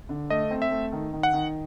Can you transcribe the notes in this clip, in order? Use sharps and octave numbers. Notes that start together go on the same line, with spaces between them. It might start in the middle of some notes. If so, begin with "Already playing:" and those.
D3
A3 D#5
C4
E5
A3
D#3
D#3
F#5
D#3